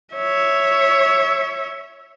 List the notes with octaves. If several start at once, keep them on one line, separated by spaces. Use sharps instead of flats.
C#5 E5